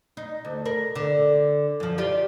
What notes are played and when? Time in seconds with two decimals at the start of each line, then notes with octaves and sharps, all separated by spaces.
0.17 D#4
0.45 D2
0.65 A#4
0.95 D3
1.80 F#2 F3
1.98 F4 G4 D5